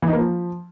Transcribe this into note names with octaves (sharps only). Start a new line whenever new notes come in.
E3
D#4
A#3
F3